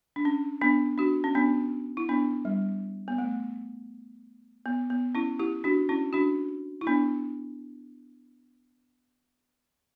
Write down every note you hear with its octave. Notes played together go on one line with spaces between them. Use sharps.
D4
C#4
B3 D4
D4 F#4
C#4
B3 D4
E4
B3 D4
G3
B3
A3
B3
B3
C#4 E4
E4 G4
D4 F#4
C#4 E4
D4 F#4
E4
B3 D4